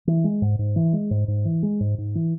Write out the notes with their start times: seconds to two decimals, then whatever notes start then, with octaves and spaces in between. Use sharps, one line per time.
0.07 E3
0.24 G#3
0.42 G#2
0.59 G#2
0.76 E3
0.93 G#3
1.11 G#2
1.28 G#2
1.45 E3
1.63 G#3
1.80 G#2
1.98 G#2
2.15 E3